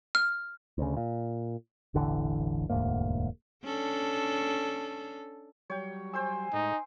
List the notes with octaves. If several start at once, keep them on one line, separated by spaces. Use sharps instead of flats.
F6
D2 C#3
A#2
E1 A1 D3 E3
E1 D2 G#2 A#3
C#4 D4 A4
F#3 G3 C#5 G5
C5 G5 G#5 E6
A2 G#3 D#4